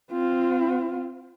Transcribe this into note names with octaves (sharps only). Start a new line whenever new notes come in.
C4 F4